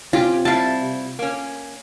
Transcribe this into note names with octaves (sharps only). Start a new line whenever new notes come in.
C3 C#4 F4 G4
G3 E4 F5 A5
A#3 C#4